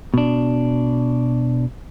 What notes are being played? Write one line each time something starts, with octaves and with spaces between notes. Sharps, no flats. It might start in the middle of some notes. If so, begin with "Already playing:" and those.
B2 D4